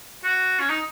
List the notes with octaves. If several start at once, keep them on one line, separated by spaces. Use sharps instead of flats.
F#4
C#4
D#4